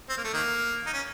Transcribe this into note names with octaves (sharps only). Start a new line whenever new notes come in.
C4
A#3
A3
D#3 A#3
D#4
C#4